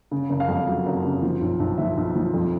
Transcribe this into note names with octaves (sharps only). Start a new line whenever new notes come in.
C#3
F#1
F5
F2
F#3
F#1
C#3
F3
B1
B1
F3 E5
B1
F3
F2